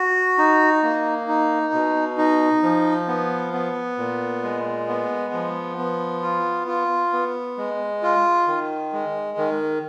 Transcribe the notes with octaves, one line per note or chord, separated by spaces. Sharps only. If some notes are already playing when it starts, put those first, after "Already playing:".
Already playing: F#4
D#4
A#3
D#4
B2
D#4
F3
B3
B3
A#2
G#3
B3
F3
B3
F4
F4
B3
G#3
F4
D#3
G#3
D#3